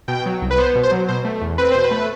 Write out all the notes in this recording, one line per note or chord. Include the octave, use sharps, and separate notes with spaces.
B2 G5
F#3
C2
B4
B3 C5
B2
C5
F#3
B2 C5
A3
E2
C4 B4
B2 C5
B4
A3